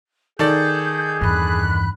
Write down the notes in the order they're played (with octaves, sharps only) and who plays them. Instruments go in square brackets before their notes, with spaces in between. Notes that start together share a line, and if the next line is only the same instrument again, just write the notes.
[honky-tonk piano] D#3 A4 D5 [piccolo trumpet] G#4 [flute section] G6
[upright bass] E2 G2 [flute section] B5 F#6